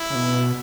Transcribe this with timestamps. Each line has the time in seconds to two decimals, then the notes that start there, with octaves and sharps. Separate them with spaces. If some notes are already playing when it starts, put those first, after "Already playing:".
Already playing: E4
0.10 C#3
0.15 B2